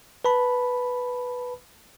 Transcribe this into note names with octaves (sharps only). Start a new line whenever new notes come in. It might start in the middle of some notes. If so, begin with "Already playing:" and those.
B4 A5 B5